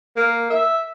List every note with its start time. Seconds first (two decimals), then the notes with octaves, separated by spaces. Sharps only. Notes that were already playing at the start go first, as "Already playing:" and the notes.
0.16 A#3
0.50 E5